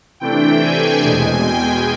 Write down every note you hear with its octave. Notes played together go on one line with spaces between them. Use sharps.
C3 E3 A3 D4 G5
G#5
E2 B2 G#3
G5